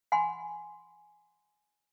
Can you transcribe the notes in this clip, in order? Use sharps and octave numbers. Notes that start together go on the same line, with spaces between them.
F#5 G#5 B5 C6